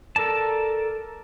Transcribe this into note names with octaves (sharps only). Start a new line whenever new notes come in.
A4 A#4 D5 A5